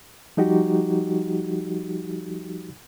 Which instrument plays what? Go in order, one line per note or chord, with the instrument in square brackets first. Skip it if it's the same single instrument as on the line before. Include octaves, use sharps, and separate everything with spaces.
[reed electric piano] F3 G3 D#4 F#4 G4